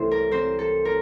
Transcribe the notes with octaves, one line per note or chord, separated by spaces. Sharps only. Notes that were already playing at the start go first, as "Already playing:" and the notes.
Already playing: C2 C3 E3 A3 C4 C5
A#4
C4 C5
A4
A#4